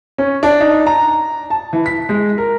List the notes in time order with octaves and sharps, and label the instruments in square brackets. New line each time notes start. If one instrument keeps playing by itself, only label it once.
[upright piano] C#4
D4
D#4
A#5
A5
E3
B6
G#3
A#4